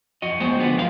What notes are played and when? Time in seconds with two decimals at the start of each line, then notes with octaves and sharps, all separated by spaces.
0.22 F2 F#4 D#5
0.40 G#3 B3 C5 G5
0.59 D3 F3 B3
0.76 F#2 G#3 A#3 F5